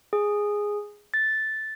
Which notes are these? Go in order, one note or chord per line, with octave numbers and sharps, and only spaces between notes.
G#4
A6